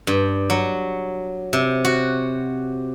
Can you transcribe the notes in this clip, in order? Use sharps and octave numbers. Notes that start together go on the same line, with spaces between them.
G2
F#3
C3
F#4